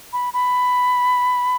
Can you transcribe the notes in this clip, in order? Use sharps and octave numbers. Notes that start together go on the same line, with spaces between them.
B5
B5